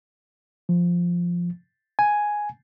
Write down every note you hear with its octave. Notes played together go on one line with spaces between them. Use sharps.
F3
G#5